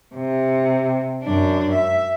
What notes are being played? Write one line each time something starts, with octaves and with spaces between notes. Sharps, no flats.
C3
F#2 D4
E5